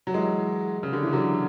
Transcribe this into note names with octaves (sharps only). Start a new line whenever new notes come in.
F#3
E3 G#3
C#3
D3
E3
D3 F#3